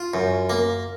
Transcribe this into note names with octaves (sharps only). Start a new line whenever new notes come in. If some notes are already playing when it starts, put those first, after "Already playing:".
Already playing: F4
F#2
A#3